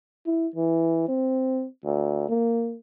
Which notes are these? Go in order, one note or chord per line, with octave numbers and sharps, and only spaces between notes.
E4
E3
C4
D2
A#3